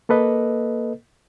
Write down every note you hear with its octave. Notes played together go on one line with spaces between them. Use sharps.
A#3 A4 B4 D#5